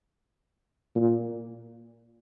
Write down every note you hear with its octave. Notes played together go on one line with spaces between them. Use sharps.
A#2